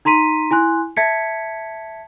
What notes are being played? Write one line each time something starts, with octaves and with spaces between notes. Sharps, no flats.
D#4 A#5 C6 B6 D#7
E4 G#5 C6 F#6
E5 A5 G#6 B6 C#7